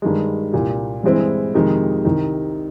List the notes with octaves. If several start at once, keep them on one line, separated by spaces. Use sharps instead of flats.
G2 D#3 G#3
C2 A#2 G3
G2 E3 G#3 C4 E4
F2 C3 D#3 G#3
C2 C3 D#3